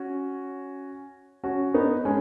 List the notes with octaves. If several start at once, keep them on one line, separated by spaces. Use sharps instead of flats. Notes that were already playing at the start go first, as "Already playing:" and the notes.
Already playing: C#4 F#4
C#4 F#4
B3 D#4
G#3 C#4